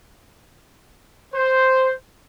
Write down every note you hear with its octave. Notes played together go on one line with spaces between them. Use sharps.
C5